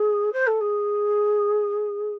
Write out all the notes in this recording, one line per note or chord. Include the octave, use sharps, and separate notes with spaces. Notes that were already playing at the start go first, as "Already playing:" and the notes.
Already playing: G#4
C5
A4
G#4